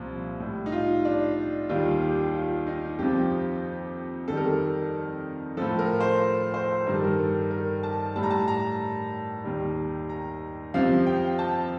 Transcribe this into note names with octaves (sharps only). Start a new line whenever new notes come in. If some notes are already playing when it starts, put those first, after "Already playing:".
Already playing: C2 A#2 F3
A2 G3
D#4
F4
D4
D#2 D#3 G3 F4
G4
F4
D#4
F2 C3 F3 G4
F2 D#3 G3 A4
A#4
A4
A2 F3 A4
A#4
C5
C5
G2 D#3 G3 A#4
A4
A#4
A4
A#4
A5
A2 G3 A5
A#5
A5
A#5
D#2 D#3 G3
A#5
F2 C3 F3 F5
G5
A5